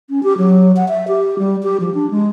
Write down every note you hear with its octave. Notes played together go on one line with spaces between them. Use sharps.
C#4
G4
F#3
F#5
E5
G4
G3
G4
F3
D4
G#3